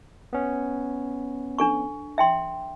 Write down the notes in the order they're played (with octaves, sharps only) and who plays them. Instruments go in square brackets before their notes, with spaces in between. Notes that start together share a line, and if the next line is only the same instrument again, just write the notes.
[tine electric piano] B3 C#4
[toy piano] D4 A4 C#6
E5 G5 C6